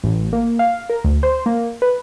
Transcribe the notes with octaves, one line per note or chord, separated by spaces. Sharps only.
A1
A#3
F5
A#4
D2
C5
A#3
B4